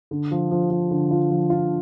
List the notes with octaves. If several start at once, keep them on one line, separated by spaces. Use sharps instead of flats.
D3
F3
F3
F3
D3
F4
F3
F4